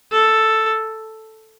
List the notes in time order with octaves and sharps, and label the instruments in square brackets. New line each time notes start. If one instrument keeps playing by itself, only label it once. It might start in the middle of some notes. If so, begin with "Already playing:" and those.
[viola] A4